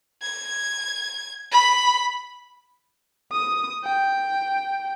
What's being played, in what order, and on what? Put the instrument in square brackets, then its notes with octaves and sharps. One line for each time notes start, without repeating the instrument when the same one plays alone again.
[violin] G#6
B5
[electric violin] D#6
G5